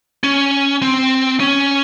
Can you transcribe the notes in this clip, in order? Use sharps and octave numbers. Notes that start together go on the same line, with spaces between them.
C#4
C4
C#4